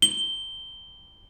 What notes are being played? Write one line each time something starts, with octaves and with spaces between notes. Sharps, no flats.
G7